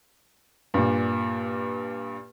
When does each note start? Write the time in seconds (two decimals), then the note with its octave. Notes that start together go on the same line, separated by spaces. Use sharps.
0.74 G2 A#2